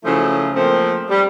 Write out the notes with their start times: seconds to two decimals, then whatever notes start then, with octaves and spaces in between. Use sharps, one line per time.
0.05 C#3 F3 F#3 A3 E4
0.56 F3 A3 A#3 C4
1.09 G3